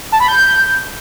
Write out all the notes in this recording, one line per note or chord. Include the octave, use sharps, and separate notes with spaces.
A5
B5
G6